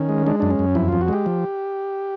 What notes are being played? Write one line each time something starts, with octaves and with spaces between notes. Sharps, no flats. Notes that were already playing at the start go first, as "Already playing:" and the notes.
Already playing: D#3 C#4
G#3
G#3 D4
F#2 D4
C#4
F#2
F2 E4
F2 F4
F#4
G#3 G4
F3